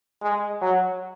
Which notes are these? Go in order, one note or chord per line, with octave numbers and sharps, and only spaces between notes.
G#3
F#3